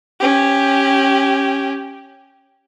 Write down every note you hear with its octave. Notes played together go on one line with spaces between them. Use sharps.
C#4 G4